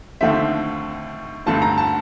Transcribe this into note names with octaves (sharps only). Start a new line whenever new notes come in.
D#2 D3 F3 A3 C4 E5
G2 D3 F3 A3 C4 A5
A#5
A5